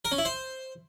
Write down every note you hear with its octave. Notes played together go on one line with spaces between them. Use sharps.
A#4
C#4
E4
C5